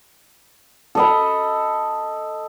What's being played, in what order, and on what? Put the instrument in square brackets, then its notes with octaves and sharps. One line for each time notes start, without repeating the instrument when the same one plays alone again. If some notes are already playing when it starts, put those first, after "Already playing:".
[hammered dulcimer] A4 D#5 B5